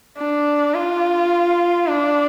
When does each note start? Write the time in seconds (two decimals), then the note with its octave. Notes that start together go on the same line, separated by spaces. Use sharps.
0.17 D4
0.74 F4
1.87 D4